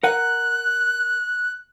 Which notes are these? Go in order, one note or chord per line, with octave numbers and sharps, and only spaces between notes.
A#4 F#5 F#6